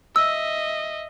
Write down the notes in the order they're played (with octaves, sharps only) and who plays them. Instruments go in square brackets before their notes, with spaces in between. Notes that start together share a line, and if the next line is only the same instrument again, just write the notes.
[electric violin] D#5 E5 [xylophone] E6